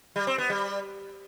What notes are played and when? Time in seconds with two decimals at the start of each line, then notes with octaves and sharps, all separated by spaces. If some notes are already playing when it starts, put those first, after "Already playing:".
0.16 G3
0.27 C4
0.38 B3
0.50 G3